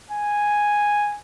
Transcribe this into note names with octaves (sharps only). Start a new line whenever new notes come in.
G#5